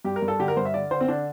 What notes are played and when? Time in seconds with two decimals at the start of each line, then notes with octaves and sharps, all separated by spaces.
0.05 G2 G4
0.16 A#4
0.22 G2
0.28 A4
0.39 D3 G4
0.48 A#4
0.57 G2 C5
0.65 E5
0.74 D3 D5
0.91 D3 C5
1.01 C4
1.08 D3 D4